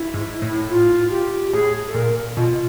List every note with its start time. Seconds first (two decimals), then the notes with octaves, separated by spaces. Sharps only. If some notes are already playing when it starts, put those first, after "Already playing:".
Already playing: E4
0.14 G#2
0.42 A2
0.70 F4
1.11 G4
1.53 A2 G#4
1.88 A4
1.94 A#2 A#4
2.37 B2 F4